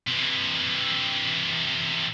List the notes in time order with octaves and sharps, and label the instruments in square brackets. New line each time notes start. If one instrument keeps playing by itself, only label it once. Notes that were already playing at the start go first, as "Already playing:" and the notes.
[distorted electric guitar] C3 E3